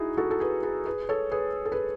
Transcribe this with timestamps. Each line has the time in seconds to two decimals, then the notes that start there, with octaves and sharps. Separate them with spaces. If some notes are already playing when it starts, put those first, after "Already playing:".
Already playing: D#4 E4 F#4 G#4
0.17 F#4 A4
0.31 A4
0.40 G#4 B4
0.63 G#4 B4
0.86 G#4 B4
1.09 A4 C#5
1.31 G#4 B4
1.65 A4
1.72 G#4 B4